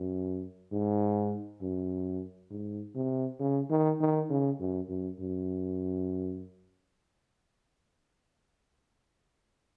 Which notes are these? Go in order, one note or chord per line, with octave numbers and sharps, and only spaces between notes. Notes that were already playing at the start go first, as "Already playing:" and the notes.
Already playing: F#2
G#2
F#2
G#2
C3
C#3
D#3
D#3
C#3
F#2
F#2
F#2